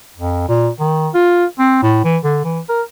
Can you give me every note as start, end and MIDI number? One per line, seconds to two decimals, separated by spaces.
0.17 0.48 41
0.48 0.69 46
0.80 1.09 51
1.14 1.46 65
1.59 1.81 60
1.83 2.03 45
2.04 2.17 52
2.24 2.39 50
2.44 2.60 52
2.69 2.82 70